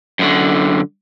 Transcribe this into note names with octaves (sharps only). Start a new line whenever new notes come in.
F#2 D3